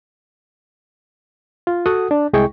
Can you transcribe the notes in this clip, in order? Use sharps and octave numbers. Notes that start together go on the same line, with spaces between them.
F4
F#4 A4 F#5 D#6
D4
C2 G#3 E4 G#4 G5 C#6